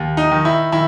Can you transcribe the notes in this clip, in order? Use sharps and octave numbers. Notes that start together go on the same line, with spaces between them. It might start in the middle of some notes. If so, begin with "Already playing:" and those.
Already playing: D#2
D#4
D#3
E4
D#3 E4